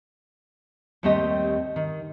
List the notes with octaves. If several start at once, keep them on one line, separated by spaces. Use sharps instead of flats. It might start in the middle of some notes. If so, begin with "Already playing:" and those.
D#2 G3 A3 C4 G4 D#5
D#3